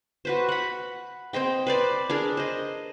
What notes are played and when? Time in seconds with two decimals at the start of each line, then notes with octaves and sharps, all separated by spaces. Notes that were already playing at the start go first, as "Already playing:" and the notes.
0.25 F#4 B4 C5
0.49 F#5 B5
1.33 C4 C5 D#5 G5
1.67 B4 C5 D5
2.10 D4 G#4 A#4
2.37 C5 D#5